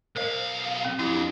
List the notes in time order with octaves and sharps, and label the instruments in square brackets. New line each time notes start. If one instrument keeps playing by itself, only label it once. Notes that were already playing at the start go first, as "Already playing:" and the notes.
[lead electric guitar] B1 F5 [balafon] A#4 C5 D#5
[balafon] C4
[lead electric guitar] F2 [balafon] E4 G4
[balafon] D4